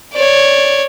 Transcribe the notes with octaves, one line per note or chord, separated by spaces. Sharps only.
C#5 D5